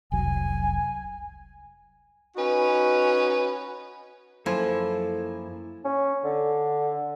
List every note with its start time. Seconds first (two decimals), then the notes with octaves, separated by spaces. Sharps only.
0.12 F1 C2 F#3 G#5
2.35 C#4 D#4 F#4 B4
4.46 F#2 F3 A#3 E4 A4 G#5
5.85 C#4
6.24 D3